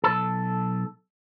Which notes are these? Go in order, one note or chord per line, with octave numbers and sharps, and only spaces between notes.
B1 A4